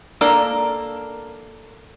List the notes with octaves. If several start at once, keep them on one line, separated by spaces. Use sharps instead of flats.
A#3 D4 A4 A#4